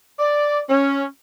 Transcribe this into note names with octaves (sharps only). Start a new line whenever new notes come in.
D5
C#4